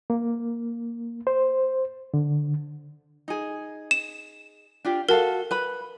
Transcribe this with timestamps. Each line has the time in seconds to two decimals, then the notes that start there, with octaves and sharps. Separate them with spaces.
0.10 A#3
1.27 C5
2.14 D3
3.28 D#4 G#4
3.91 E7
4.85 D4 F4 G4
5.09 F#4 A4 A#4 F5
5.51 B4 B5